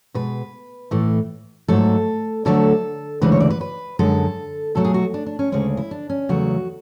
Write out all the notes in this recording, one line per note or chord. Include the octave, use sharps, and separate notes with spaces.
B2 G#3 B4
A2 E3 A3
G#2 F#3 A3 A4
D2 D3 F#3 A3 A4
D2 C#3 E3 G#3 B4
C#5
D5
B4
B4
F#2 D3 G#3 A4
B2 F#3 A3 A4
G#4
F#4
D4
D4
C#4
D2 C#3 G#3 C#4
E4
D4
C#4
E2 C#3 F#3 A3 F#4